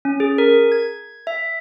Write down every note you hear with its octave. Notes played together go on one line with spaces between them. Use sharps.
C#4
G#4
A#4
G#6
E5